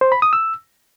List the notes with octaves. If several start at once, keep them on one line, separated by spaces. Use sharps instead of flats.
C5
B5
D#6
E6